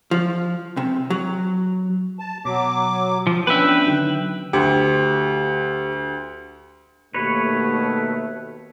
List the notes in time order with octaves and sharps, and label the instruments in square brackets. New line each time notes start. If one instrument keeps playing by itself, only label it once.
[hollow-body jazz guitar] F3
C3
F#3
[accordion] A5
[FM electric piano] B2 [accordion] F#3 D6
[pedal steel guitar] F3
[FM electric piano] B3 C#4 D4 [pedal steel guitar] B4 E5 [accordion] G5
[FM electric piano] D3 D#3 F#3
[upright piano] D2 [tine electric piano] G4
[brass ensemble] D#2 B2 A3 [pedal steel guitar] B4 C#5